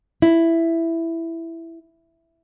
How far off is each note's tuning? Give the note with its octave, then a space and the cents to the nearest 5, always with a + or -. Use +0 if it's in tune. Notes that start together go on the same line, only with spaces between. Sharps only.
E4 +5